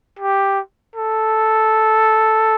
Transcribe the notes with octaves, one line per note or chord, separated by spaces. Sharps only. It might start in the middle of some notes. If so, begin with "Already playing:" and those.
G4
A4